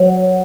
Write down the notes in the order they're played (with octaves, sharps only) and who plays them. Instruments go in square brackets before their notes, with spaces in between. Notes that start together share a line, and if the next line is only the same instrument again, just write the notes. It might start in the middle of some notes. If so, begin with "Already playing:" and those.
Already playing: [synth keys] F#3